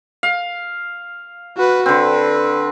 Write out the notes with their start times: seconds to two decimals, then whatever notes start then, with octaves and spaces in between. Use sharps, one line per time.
0.23 F5
1.57 F#4 B4
1.86 D3 C4 B4